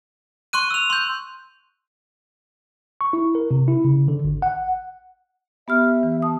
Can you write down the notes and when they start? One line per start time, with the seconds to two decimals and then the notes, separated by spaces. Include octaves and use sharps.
0.53 C6 C#6 F#6 D#7
0.71 E6 F7
0.90 C6 G6
3.01 C#6
3.13 E4
3.35 A#4
3.51 C3
3.68 E4
3.85 C#3
4.08 D3
4.25 G#1
4.42 F#5
5.68 B3 G4 E5 F6
6.03 E3
6.22 A5 D#6